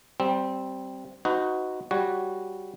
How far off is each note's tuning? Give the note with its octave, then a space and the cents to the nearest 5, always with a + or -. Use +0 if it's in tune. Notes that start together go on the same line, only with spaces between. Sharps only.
G3 -15 C4 +0
D#4 +15 F#4 +0 B4 +45
G3 +0 F#4 +0 C#5 +0